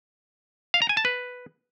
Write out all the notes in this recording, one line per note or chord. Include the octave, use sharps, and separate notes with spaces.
F5
A#5
G#5
A5
B4